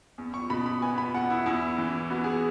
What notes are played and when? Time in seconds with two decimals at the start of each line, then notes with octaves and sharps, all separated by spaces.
0.18 E2
0.34 C#6
0.50 B2 B5
0.66 B5
0.82 B3 G#5
0.98 B5
1.14 E2 F#5
1.30 E4
1.46 E2 E4
1.78 E3
2.10 B3 F#4
2.24 G#4